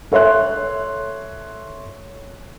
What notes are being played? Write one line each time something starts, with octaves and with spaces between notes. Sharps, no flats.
A4 C#5 E5 C6 F#6